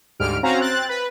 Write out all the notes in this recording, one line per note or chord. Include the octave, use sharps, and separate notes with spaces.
D2 G#2 G3 F6 D7
C4 C#4 F#4 F5 A#5
C4 F#6 A6
B4